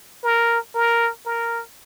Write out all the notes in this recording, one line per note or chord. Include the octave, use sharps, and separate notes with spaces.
A#4
A#4
A#4